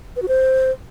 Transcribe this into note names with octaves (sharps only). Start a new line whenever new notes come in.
B4
F#4
C5